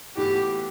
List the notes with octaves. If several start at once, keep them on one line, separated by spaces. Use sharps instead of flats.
A2 E3 B3 F#4 G4